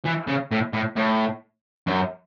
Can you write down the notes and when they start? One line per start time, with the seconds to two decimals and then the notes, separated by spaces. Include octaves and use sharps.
0.06 E3
0.28 C#3
0.51 A2
0.73 A2
0.97 A2
1.87 F#2